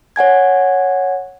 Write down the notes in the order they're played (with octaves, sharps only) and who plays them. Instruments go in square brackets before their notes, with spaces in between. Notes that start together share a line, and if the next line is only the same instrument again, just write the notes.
[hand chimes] C#5 F#5 G#5 G#6